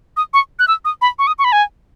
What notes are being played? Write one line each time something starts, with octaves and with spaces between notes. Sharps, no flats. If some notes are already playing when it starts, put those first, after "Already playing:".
D#6
C#6
F#6
E6
D#6
B5
C#6
D#6
C#6
B5
G#5